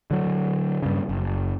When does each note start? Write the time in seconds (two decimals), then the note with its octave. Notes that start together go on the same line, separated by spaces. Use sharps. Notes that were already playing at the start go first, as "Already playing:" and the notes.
0.11 D3 F#3
0.83 G2 C#3
1.09 F#1